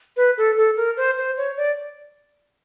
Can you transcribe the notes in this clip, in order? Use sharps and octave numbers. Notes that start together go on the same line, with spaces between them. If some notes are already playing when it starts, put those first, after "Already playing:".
B4
A4
A4
A#4
C5
C5
C#5
D5